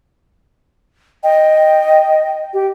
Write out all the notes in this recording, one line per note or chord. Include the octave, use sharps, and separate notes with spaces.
D#5 G5
G4